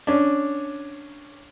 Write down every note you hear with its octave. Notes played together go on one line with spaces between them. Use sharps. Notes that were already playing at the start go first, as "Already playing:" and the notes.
C#4 D4